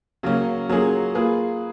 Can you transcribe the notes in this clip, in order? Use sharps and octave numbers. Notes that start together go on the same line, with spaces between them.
C#3 F#3 A#3 C#4
F#3 A#3 C#4 F4 G#4
A#3 F4 G#4 B4